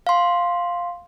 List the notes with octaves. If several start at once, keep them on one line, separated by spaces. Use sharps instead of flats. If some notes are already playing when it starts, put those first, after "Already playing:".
F5 C6